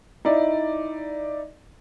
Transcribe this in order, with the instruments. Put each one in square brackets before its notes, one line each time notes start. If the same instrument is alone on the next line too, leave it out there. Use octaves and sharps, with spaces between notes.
[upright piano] D#4 E4 D5